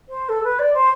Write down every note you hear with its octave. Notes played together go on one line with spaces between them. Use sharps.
C5
A4
B4
D5
C5